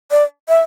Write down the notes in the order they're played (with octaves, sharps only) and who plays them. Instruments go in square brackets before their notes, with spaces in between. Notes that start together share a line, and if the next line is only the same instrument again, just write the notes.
[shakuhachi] D5
E5